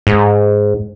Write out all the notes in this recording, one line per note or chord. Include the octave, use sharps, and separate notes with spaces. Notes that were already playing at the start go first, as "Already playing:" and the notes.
G#2